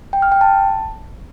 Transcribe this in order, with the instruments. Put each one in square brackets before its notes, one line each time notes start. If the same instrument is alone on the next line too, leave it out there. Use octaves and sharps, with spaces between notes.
[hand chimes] G5
F6
G5
A5